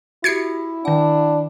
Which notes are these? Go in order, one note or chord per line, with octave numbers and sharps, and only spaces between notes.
E4 F#4 G4 G#6 C7 C#7
D#3 D4 F#5